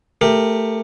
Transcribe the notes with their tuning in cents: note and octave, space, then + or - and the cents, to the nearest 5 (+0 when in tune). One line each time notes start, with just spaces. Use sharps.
A3 +10 G4 +15 A#4 +0